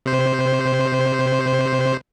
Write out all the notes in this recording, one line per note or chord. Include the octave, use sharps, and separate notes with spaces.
C3 C5